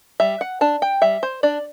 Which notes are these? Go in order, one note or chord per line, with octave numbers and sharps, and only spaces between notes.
G3 E5
F#5
D4 A5
G5
G3 E5
C5
D4 D5